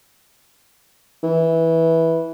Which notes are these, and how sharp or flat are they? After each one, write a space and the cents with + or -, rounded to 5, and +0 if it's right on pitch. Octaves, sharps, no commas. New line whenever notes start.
E3 -10